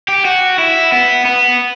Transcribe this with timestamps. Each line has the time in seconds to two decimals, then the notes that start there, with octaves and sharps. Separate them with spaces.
0.08 G4
0.25 F#4
0.58 E4
0.92 B3
1.25 B3